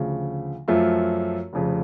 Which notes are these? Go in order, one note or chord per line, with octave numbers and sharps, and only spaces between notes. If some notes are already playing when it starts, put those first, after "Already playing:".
Already playing: D2 C#3 F3
F#2 F3 A3 F4
F1 F2 C#3